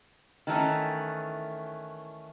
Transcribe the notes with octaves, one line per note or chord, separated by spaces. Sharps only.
D#3 E3 A3 C#4